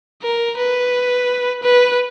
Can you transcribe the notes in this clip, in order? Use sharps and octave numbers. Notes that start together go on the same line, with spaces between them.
A#4
B4
B4